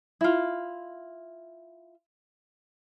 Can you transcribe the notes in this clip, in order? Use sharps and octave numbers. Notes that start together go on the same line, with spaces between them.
E4 F4